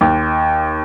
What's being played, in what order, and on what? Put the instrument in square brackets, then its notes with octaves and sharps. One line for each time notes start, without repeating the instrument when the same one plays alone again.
[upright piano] D#2